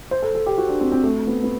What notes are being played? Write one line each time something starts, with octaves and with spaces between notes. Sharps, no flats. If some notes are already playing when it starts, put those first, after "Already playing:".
C5
A4
A4
G4
F#4
D4
C4
C4
A3
B3
B3